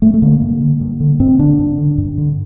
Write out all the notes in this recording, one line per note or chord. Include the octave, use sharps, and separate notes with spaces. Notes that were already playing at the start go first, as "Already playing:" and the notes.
G2 A3
A3
D3 A#3
G2
D3
G2
D3
G2 C4
D3 D4
G2
D3
G2
D3